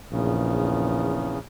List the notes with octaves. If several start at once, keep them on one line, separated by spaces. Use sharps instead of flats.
A#1 E2 C#3